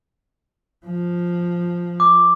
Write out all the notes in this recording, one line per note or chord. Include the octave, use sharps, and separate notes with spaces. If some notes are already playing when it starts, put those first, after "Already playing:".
F3
D6